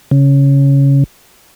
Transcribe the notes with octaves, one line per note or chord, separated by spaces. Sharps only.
C#3